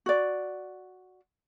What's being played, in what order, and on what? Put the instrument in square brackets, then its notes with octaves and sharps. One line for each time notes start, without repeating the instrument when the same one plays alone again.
[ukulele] F#4 D5